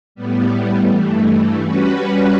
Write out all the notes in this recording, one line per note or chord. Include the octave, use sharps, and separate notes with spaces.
A2 G3 B3
G2 E3 A3
G3 C#4 F#4 B4